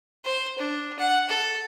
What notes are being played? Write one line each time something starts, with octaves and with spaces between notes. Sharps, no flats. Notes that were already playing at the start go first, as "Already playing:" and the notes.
C5
D4
F#5
A4